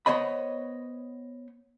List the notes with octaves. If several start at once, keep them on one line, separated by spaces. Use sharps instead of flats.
B3 C5 C#5 D#5 B5